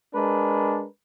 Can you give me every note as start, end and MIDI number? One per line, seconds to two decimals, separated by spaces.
0.13 0.85 56
0.13 0.85 62
0.13 0.85 70
0.13 0.85 71